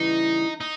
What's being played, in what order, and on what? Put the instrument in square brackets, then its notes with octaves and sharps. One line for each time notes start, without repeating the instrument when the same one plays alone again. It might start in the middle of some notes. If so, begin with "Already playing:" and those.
Already playing: [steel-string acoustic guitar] C#3 E3 G3 [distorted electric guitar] D#4
[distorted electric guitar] D#4